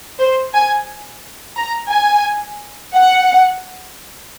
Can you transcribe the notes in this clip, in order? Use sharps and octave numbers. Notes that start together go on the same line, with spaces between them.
C5
G#5
A#5
G#5
F#5